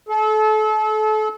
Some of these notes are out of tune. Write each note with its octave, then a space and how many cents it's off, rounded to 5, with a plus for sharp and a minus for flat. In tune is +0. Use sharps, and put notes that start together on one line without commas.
A4 -35